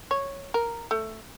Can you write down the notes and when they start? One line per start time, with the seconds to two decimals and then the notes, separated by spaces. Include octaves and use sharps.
0.11 C#5
0.54 A#4
0.91 A3